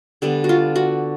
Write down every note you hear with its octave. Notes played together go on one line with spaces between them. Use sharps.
D3 G3 B3
F#4
F4
F#4